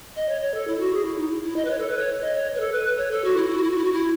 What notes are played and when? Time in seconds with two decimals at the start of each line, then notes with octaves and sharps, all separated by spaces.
0.16 D#5
0.29 C#5
0.41 C#5
0.54 A4
0.67 E4
0.80 F#4
0.93 G#4
1.05 E4
1.18 D#4
1.31 E4
1.44 E4
1.56 D#5
1.65 B4
1.70 C#5
1.79 A4
1.88 B4
1.99 C#5
2.22 D#5
2.34 C#5
2.55 B4
2.60 A4
2.72 B4
2.98 C#5
3.11 A4
3.24 F#4
3.37 E4
3.50 E4
3.57 F#4
3.63 E4
3.71 F#4
3.78 E4
3.85 F#4
3.93 E4